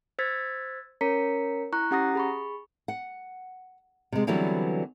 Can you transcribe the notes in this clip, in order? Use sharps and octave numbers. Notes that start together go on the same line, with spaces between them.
C5 E6 G#6 A6 B6
C#4 A#4 C#5 A#5 B6 C#7
E4 A#5 C#6 F#6
C#4 G4 F#5 A#5 D#6 A#6
G#4 B5 C#6
F#5
C3 G#3
D3 E3 F#3 G3 B3 C4